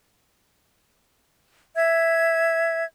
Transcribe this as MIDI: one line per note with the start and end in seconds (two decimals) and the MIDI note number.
1.75 2.85 76
1.75 2.85 92